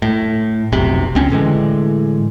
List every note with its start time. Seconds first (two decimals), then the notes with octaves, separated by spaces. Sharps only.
0.02 A2
0.72 F1 B1 C3
1.15 C#2 C4 C#4
1.30 A2 D3 E3 G#3